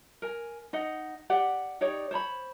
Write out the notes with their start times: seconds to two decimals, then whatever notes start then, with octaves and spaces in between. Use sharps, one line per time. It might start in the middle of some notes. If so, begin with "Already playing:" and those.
0.22 A#4 G#5
0.73 D#4 D#5 F#5
1.30 G4 D5 F#5
1.81 D#4 G4 C#5 D5
2.11 C5 C#5 A#5 B5